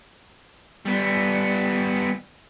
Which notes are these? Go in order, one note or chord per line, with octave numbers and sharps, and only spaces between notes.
G3 B3